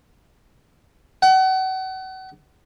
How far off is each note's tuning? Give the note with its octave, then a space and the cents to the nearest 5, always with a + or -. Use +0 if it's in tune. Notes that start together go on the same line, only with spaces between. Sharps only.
F#5 +35